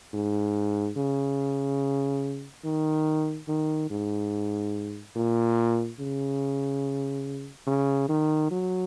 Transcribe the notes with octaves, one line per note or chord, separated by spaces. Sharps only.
G#2
C#3
D#3
D#3
G#2
A#2
C#3
C#3
D#3
F#3